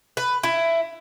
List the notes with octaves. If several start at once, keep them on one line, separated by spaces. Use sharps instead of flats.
B4
E4